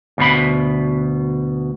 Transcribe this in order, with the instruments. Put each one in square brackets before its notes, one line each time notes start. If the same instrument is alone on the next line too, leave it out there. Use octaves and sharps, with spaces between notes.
[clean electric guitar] D2 B2 B5